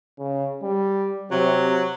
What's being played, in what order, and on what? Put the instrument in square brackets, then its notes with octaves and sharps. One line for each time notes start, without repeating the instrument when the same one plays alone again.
[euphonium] C#3
G3
[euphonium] C3 [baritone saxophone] F#3